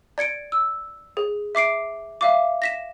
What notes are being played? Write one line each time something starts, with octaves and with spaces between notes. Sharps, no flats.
D5 G#6 C#7 D7
E6
G#4
E5 D6 C7 D7
E5 F5 D6
A#6 B6 E7